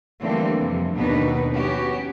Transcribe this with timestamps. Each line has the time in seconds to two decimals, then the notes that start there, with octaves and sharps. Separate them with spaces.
0.21 D3 E3 G3 A3 A#3 C4
0.60 F2 C3
0.94 D#2 B2 B3 D4 D#4 B4
1.53 B3 C#4 F#4 G4